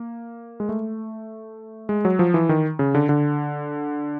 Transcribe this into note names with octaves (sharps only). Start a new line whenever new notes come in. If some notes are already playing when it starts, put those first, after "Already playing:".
Already playing: A#3
G#3
A3
G#3
F#3
F3
E3
D#3
C#3
D3
D3